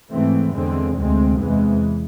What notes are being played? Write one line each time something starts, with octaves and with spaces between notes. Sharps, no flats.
G#2 E3 A3 C4
E2 D3 G#3 C4
D2 C3 G#3 C4
E2 C3 E3 G#3